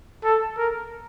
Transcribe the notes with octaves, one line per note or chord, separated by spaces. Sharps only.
A4
A#4